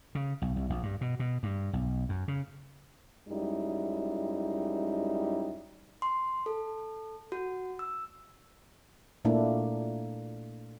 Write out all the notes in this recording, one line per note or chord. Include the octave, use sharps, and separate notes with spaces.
C#3
B1
C2
A#1
G2
B2
B2
G2
B1
F#2
C#3
F#2 G3 G#3 D#4 E4
C6
A4
F#4
E6
A#2 A3 A#3 D4 E4